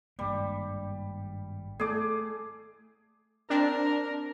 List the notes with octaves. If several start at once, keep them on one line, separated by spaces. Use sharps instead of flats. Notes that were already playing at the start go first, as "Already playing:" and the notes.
G#1 G2 G3 A#3
A3 G#4 D5 D6
C4 D4 A#4